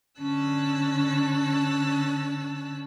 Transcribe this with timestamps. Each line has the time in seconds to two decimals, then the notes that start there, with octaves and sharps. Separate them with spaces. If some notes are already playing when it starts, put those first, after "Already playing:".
0.20 D3 C#4 A5 E6 F#6